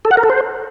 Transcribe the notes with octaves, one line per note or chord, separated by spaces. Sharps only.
A4
F#5
A#4
A4
C5